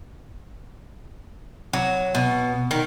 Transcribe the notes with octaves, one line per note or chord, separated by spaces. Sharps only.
F#3
B2
D#3